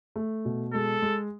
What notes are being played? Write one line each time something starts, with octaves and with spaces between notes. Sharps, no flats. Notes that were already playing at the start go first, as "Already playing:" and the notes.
A3
B2
G#3 A4
G#3